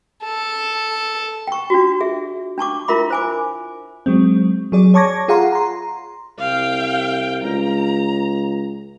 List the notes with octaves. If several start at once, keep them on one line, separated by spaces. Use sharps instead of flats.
A4
G5 C#6
D4 F4 F#4
G#4 E5
D4 A5 C#6 D6
E4 F4 A#4 E5 B5 D6
C5 G#5 D6
F#3 G#3 C4
F#3 G#4 D5
C#5 A5 C#6 D6 G#6 A#6
F4 G#4 F5 F#5 A#5 C6
A#5 C6
C2 F5 G5
C#2 A#5